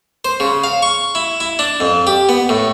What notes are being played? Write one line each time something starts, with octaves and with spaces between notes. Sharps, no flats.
C5
C#3
F5
C#6
E4
E4
D4
F2
G4
B3
A2